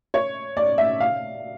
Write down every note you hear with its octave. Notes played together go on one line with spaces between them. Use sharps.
C#5
D5
E5
F5